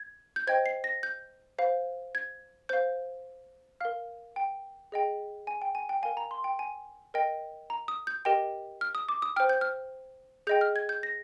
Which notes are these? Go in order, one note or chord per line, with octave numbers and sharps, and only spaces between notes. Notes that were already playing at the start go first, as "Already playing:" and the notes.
Already playing: G#6
G6
C5 D#5 G5 G#6
C7
A#6
G6
C5 F5
G#6
C5 F5 G6
A#4 F5 F6
G5
G#4 D#5 G5
G#5
G5
G#5
G5
A#4 F5 G#5
A#5
C6
G5
G#5
A#4 D#5 G5
A#5
D#6
G6
G4 A#4 D#5 G5
F6
D#6
D6
D#6
C5 G5 F6
G6
F6
G#4 D#5 G5 G6
F6
G#6
G6
A#6